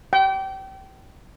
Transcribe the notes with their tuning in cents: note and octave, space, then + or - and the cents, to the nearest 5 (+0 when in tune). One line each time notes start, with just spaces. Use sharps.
G5 -30